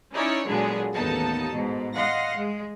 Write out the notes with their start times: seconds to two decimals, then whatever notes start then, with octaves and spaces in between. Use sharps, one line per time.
0.13 C#4 D#4 E4 C#5 D5
0.48 A#2 D3 F#3 G#3 B3 G#4
0.94 A1 D#2 B3 D#4 A4 A5
1.52 G#2 B2
1.94 D#5 F5 F#5 C6 A#6
2.35 G#3